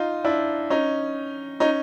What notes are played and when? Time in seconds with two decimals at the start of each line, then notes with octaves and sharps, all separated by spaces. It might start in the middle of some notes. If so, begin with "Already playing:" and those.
Already playing: D#4 F4
0.24 D4 E4
0.70 C#4 D#4
1.60 C#4 D#4